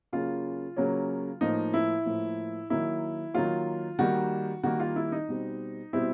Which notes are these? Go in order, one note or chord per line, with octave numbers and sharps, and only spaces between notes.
C#3 F#3 A#3 C#4 F4
C#3 F#3 A#3 C#4
A2 F3 A#3 D#4
E4
A2 F3 A#3
D#3 F#3 A#3 E4
D#3 F#3 A#3 F4
D#3 G3 A#3 F#4
D#3 G3 A#3 F#4
F4
E4
D#4
B2 G3 C4
B2 G3 C4 E4